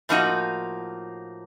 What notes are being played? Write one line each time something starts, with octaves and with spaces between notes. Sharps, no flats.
A2 F3 A#3 D#4 F#4